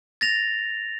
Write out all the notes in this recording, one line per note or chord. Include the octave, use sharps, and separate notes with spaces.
A6 A#6 F7